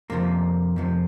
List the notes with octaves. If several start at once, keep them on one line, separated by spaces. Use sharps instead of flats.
F2 C3 F3 A#3 A#4
F2 C3 F3